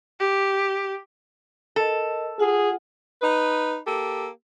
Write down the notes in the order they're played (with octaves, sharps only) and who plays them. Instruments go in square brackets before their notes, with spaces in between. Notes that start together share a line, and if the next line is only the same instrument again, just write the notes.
[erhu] G4
[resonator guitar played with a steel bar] A4 [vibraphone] A#4 D#5
[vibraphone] F4 F#5 [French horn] G#4
[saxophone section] D#4 B4
A#3 G4 A4